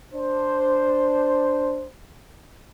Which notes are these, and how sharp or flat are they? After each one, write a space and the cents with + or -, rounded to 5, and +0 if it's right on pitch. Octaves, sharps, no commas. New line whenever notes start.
D4 -5 C5 +0